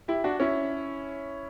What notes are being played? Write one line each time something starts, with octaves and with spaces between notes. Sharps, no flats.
E4 G4
D4 F#4
C#4 E4